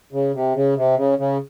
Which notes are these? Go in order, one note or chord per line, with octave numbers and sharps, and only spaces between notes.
C#3
C3
C#3
C3
C#3
C#3